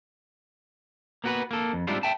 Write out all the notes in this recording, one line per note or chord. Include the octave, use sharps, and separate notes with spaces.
A#3 B3 F#4 A#4 B4
A#3 A4
F2
G#2 G3 C4 D4 E4 F4
E5 G5 A5